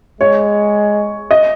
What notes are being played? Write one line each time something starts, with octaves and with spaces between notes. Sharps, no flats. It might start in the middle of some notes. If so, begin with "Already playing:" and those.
G#3 C#5
D#5